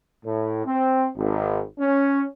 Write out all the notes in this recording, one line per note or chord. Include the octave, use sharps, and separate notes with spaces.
A2
C4
G#1
C#4